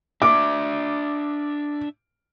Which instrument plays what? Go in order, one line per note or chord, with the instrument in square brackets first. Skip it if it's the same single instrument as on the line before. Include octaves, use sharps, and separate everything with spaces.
[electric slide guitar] D4 E5 [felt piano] D6